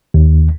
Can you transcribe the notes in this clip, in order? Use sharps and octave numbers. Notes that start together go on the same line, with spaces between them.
D#2